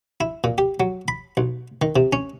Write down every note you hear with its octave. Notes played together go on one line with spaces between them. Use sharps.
E4
A#2
G4
F#3
B5
B1
D#3
C3
C#4